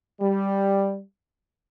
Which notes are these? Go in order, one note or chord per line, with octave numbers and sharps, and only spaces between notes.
G3